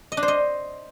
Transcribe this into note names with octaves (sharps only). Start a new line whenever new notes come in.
D#5
D4
C5
D#5